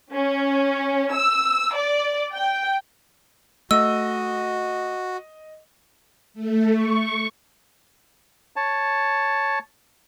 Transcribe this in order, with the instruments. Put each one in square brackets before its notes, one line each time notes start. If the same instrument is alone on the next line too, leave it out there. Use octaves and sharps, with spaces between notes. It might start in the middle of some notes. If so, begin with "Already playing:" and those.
[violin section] C#4
E6
D5
G5
[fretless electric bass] A3 [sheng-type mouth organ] F#4 [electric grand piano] D#5 [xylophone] E6
[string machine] A3
C#6
[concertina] C#5 A5